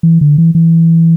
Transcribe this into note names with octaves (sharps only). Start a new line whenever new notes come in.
E3
D3
E3
E3